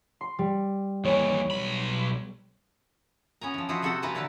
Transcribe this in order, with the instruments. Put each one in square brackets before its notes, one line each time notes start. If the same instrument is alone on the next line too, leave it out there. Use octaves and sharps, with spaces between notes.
[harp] C6
G3
[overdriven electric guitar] D#2 E3 [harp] C#5
[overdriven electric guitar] B1 B5 [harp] D#7
[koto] B3 C#4 G#5 A#5
E3 F3
F3 E4 F#4 B4 C5 D#5
C3 C4 F#4 A4 C5 F#5
C3 E3 A#3 B4 A5 A#5
A2 D3 E4 A#4 B4 A5